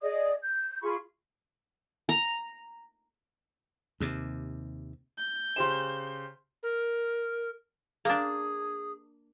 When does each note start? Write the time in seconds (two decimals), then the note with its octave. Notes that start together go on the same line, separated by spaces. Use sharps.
0.01 G#4 D5 D#5 D#6
0.42 G6
0.82 F4 G#4 B5 C#6
2.09 A#5
4.00 D#2 C3
5.18 G6
5.56 C#3 G4 C5 C6 E7
6.63 A#4
8.05 A#3 D4 G#4